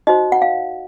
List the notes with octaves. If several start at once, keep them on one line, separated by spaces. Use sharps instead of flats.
D#4 F#4 C5 D#5
F#5
F5